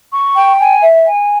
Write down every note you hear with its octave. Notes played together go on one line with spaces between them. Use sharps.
C#6
G5
G#5
E5
G#5